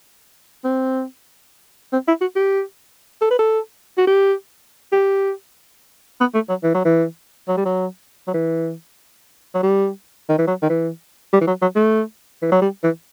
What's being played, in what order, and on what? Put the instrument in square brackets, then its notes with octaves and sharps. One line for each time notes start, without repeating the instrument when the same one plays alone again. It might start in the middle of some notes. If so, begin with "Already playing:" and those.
[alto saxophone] C4
C4
E4
F#4
G4
A4
B4
A4
F#4
G4
G4
B3
A3
F#3
E3
F#3
E3
F#3
G3
F#3
F#3
E3
F#3
G3
D#3
E3
F#3
D#3
E3
G3
E3
F#3
F#3
A3
E3
F#3
G3
E3